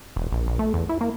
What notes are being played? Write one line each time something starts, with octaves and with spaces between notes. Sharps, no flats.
E1
A#1
A#1
A3
E2
E4
A#3